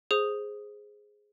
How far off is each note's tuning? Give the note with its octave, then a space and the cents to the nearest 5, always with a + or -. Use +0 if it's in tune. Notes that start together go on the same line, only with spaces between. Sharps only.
G#4 +0 C5 +5 D#6 +0